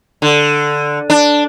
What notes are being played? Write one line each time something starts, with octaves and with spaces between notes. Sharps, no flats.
D3
D4